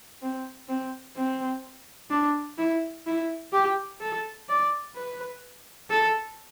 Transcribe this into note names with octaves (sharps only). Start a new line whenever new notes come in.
C4
C4
C4
D4
E4
E4
G4
A4
D5
B4
A4